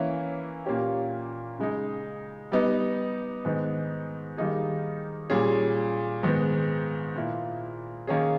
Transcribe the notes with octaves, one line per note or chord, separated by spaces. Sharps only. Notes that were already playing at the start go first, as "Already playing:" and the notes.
Already playing: E3 A#3 C#4 E4
A#2 A#3 C#4 G4
C#3 G#3 D#4
G3 B3 D#4
G#2 D#3 G#3 B3 D#4
D#3 G3 A#3 D#4 G#4
A#2 G3 C#4 G#4
G#2 D#3 G#3 B3
A#2 A#3 E4
D#3 A#3 C#4 G#4